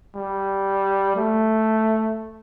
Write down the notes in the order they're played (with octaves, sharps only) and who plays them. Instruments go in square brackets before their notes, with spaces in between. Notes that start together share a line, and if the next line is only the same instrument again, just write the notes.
[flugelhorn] G3
A3